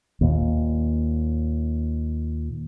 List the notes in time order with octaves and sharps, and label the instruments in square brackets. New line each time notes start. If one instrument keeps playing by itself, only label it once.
[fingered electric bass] D#2 A#2